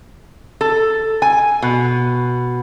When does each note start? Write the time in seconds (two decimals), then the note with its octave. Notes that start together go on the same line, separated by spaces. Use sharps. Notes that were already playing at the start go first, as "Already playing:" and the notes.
0.61 A4
1.22 G#5
1.62 B2